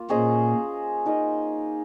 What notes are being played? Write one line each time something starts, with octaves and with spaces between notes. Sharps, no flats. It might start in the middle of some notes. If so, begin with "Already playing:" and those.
Already playing: A#3 F4
A#2 C#4 G#4 C5 D#5
D#4 A#4 D#5